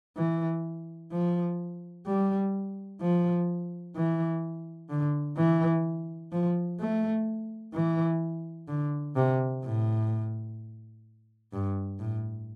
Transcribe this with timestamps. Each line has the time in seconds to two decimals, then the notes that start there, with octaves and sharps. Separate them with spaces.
0.16 E3
1.12 F3
2.06 G3
3.01 F3
3.96 E3
4.89 D3
5.37 E3
6.32 F3
6.80 A3
7.73 E3
8.68 D3
9.16 C3
9.64 A2
11.53 G2
11.99 A2